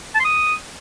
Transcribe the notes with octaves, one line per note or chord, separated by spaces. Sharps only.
A5
C6
D#6